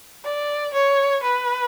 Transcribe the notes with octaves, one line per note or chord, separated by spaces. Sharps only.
D5
C#5
B4